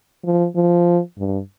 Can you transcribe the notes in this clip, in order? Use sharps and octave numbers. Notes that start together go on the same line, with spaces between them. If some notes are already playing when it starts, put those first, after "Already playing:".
F3
F3
G2